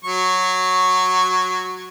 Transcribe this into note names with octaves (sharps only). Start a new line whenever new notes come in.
F#3 C#6